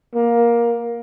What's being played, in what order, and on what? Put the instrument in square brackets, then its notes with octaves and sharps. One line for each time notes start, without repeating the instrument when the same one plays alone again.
[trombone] A#3